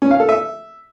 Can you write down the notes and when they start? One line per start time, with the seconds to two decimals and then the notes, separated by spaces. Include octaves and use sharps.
0.02 C#4
0.11 F5
0.20 A4
0.29 E5